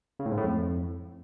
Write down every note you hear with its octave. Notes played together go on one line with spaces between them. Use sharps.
C#3
A2
G#2
A2
F2